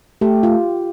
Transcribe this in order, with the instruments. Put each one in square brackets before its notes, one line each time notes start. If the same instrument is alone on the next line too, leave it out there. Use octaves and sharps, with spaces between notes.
[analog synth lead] A3 [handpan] G4
[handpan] F4